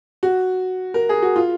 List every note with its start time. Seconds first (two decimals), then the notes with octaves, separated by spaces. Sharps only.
0.23 F#4
0.94 A#4
1.09 G#4
1.22 F#4
1.36 F4